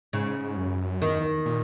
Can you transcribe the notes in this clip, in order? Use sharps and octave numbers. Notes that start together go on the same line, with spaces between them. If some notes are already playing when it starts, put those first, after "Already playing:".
G#2 C#3
F#2
E2 D#3
A#2